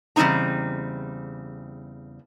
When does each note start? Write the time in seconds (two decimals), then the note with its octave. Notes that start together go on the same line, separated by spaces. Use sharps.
0.16 E2 C#3 G3 C4 D#4 A#5